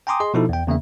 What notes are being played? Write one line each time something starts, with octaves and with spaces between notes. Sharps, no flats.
G5 G#5 A#5 C6 D6 D#6
G#4 D#5 C6
B2 F3 D#4 E4 A4
E2 G5
E2 C#3 A#3 E5